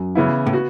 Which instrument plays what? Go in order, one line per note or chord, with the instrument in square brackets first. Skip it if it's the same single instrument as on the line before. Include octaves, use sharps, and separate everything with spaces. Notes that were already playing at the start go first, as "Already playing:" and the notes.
Already playing: [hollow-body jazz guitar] F#2
[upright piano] C#3 E3 B3 E4
[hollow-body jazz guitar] A2
[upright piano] B3 F#4